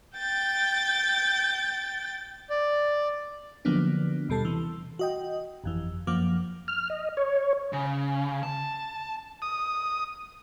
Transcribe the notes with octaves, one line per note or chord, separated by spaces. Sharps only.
G5 G6 A6
D5
D3 F3 F#3 A#3 B3 D4
D#2 B2 G3 A4 A5 C7
C3 E3
F#4 D#5 G5
G1 F2 E3
F#2 F3 A#3 F4 D6
F6
D#5
C#5
C#3
A5
D#6